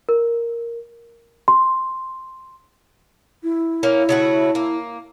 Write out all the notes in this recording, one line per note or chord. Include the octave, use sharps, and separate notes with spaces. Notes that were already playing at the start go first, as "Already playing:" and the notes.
A#4
C6
E4
A#3 C#4
C#3 A3 F#4
A#3